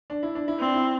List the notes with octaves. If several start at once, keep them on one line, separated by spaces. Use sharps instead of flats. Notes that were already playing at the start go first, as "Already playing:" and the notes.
D4
E4
D4
E4
C4 D4
E4